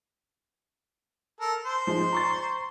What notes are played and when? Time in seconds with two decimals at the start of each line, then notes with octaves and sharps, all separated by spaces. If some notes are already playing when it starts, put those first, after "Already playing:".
1.40 A4 A#4
1.65 C5 C6
1.87 F3 G#3 D#4
2.13 A#5 C#6 A6